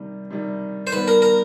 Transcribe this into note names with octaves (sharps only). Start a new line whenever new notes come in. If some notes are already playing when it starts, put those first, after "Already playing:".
Already playing: C3 D#3 G3
C3 D#3 G3
C5
D#3 G3 B3 B4
A#4
A#4